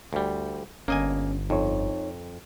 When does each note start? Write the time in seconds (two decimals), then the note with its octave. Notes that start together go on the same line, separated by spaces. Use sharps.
0.13 D2 G3
0.88 G1 A#3 C#4 D#5 G#5
1.50 F2 D#4 C#5